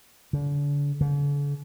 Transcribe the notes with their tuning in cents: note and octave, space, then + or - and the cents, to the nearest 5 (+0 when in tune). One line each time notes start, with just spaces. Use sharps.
D3 -35
D3 -45